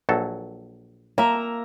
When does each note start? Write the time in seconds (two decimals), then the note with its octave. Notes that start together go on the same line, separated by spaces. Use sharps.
0.09 A#1 F#3 A4
1.18 A#3 E5 A#5